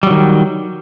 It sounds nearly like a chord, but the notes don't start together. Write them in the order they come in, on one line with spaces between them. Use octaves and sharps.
G3 F#3 D#3